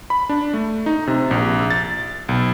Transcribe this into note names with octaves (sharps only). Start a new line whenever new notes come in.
B5
D4
A3
D#4
C3
A#1
A6
B1